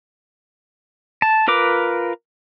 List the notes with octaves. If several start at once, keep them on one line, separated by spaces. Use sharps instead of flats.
A5
F4 A#4 B4 D6